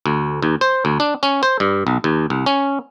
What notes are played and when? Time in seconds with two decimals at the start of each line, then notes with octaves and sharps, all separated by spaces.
0.06 D2
0.42 D#2
0.61 C5
0.85 D2
1.00 D4
1.23 C#4
1.43 C5
1.60 G2
1.87 B1
2.04 D#2
2.30 C2
2.46 C#4